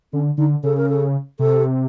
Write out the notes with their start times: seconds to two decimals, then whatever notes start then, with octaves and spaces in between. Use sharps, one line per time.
0.12 D3 C#4
0.37 D3 D#4
0.63 C#3 A4
0.76 A#4
0.89 A4
1.39 C3 A4